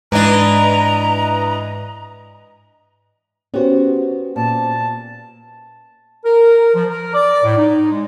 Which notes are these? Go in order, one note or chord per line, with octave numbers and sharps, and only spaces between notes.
G#2 E3 D4 E4 B4 D#5 A#5
B3 C#4 F#4 G4 C5
A#2 A5
A#4
F3
A#4
D5
A2
D#4
G#3